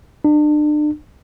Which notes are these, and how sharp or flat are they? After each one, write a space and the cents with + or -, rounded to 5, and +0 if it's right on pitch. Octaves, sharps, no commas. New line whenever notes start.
D4 +35